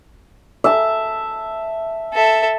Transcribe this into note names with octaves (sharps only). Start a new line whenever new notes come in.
E5 A5
A4 E5